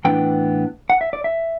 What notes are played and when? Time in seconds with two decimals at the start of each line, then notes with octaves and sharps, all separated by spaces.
0.05 A2 E3 B3 D4 G5
0.90 F#5
1.01 E5
1.13 D5
1.24 E5